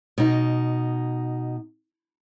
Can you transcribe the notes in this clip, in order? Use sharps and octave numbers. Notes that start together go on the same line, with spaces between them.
B2 D#4